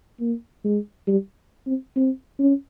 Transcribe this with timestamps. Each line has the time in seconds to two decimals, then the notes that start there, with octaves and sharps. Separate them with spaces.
0.20 A#3
0.64 G#3
1.08 G3
1.66 C4
1.96 C4
2.39 C#4